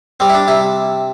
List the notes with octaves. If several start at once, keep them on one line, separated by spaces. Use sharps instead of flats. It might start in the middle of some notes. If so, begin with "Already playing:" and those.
G3 C4
E4
D4
C3 E4